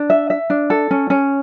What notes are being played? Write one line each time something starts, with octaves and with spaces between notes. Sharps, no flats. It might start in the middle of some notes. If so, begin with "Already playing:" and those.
Already playing: D4
E5
E5
D4
A4
C#4
C#4